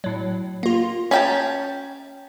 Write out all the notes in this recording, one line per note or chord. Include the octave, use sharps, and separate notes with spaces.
A2 F#3
A#3 F4
C#4 G5 A5 A#5 G#6 B6